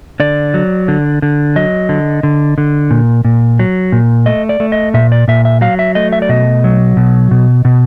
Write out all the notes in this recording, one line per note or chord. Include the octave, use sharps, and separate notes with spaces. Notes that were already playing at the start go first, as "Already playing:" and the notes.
D3 D5
F#3
D3
D3
F#3 D#5
D3
D3
D3
A#2
A#2
F#3
A#2
A3 D#5
D5
A3
D#5
A#2 E5
D5
A#2 E5
E5
F#3 F5
E5
A3 D#5
E5
D5
B2 D#5
F#3
B2
B2
B2